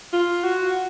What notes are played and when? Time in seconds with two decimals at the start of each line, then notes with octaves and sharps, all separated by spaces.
0.13 F4
0.44 F#4